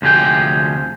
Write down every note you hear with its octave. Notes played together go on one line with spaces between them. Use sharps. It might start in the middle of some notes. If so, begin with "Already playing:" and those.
D2 C3 F3 G#4 G5